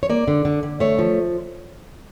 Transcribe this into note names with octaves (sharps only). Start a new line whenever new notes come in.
C#5
A#3 D5
D3
D3
D3
A3 C#5
F3